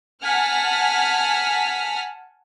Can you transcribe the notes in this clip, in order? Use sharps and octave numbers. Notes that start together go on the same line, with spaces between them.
F#5 G#5 A5 F6 B6